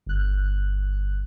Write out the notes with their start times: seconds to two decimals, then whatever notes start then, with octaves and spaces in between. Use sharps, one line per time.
0.06 G1 F#6